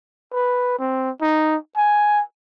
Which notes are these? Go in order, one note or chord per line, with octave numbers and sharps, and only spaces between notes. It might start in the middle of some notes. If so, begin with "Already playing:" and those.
B4
C4
D#4
G#5